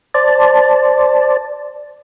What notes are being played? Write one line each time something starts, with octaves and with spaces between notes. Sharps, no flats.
C5 D5 A5